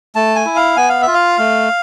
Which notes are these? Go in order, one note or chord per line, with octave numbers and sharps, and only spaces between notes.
A3 A5
G#5
E4
F5
B3 G#5
F5
E5
F4
F5
A3